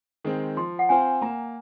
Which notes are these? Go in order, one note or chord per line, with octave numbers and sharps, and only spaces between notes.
D#3 G#3 C4
F3 C6
F#5
C4 F4 C5 G#5
A#3 A#5